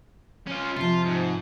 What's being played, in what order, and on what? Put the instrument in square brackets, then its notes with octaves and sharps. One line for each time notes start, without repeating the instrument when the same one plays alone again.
[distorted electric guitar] C#4 F4
[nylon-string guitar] C3 F3 [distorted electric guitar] F4
[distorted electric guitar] G#2